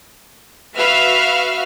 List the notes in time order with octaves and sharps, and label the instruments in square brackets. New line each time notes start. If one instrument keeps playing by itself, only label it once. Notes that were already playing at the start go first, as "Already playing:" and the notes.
[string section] F#4 B4 E5 F5 F6